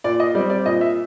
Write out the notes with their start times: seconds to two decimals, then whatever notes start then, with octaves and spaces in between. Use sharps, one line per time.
0.04 A#2 D5
0.20 D#5
0.35 G3 C4 D5
0.50 D5
0.66 A#2 D#5
0.81 E5